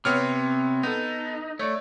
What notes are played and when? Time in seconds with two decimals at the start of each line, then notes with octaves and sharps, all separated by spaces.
0.05 C3 B3 C4 C#5 F6
0.83 B3 D#4 A4
1.59 A3 C#5 D5